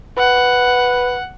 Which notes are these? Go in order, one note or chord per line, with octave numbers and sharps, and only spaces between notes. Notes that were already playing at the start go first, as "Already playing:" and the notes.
B4 F#5